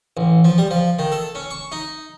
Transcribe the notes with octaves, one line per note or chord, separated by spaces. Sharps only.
A1
F3
G3
F3
D#3
A4
C#4
C#6
D#4